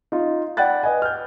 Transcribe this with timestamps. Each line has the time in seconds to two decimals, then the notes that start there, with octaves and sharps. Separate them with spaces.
0.12 D#4 F4
0.57 D5 F#5 G5 B5 F#6 A6
0.83 B4 D#5 G#5
1.02 F6 G6